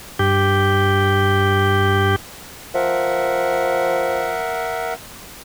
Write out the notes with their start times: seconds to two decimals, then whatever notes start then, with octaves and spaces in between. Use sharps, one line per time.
0.19 G2 G4
2.74 F3 A#4 E5 F#5